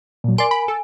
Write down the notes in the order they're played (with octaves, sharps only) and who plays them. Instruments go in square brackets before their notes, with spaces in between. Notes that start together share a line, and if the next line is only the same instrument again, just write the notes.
[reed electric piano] A#2 F#3
[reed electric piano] A#4 [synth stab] D5 C6 [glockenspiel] G#5
[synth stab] B5
A4